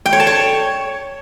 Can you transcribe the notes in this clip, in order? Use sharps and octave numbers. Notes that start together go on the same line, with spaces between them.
G5
C#5
A5
C#5